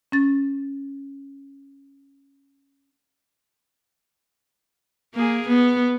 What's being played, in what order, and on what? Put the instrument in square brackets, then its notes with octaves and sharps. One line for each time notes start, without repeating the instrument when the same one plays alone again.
[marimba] C#4 A6
[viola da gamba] A#3 G#4
B3